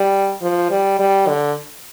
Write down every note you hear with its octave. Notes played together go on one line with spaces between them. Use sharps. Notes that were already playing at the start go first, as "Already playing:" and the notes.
Already playing: G3
F3
G3
G3
D3